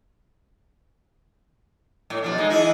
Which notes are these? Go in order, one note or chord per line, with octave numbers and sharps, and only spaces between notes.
A2
B2 F3 D4
G#3 D#4
E3 E4 G#4